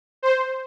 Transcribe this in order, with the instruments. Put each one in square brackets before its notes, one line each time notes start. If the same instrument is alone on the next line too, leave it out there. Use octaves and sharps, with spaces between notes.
[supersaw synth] C5